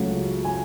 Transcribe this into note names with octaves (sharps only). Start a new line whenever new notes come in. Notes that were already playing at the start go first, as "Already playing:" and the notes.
Already playing: C#2 C#3 F#3 A3
G#5